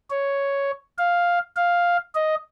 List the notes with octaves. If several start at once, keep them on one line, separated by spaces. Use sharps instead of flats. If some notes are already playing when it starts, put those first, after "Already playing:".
C#5
F5
F5
D#5